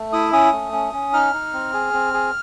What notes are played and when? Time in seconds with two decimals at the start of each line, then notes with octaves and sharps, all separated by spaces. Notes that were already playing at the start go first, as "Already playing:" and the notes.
Already playing: A3
0.13 E4 D#6
0.33 C#4 D#6
0.53 A3
0.73 C#4
0.93 C#4
1.13 D#4 F6
1.33 D#4
1.53 C4
1.73 G#4
1.94 C4
2.14 G#4